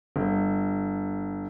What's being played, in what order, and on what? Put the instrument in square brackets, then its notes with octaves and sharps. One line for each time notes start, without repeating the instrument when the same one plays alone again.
[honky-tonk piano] G1